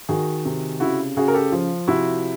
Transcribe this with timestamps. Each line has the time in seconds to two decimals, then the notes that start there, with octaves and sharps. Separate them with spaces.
0.09 D#3 F#4 G#4
0.45 C3
0.80 C#3 E4 F#4
1.17 C#3 F#4 G#4
1.28 A#4
1.34 G4 A4
1.52 F3
1.88 C3 E4 F#4